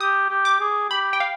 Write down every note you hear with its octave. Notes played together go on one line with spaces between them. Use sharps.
G4 D#6
G4
D6
G#4
G4 B5
G5
F5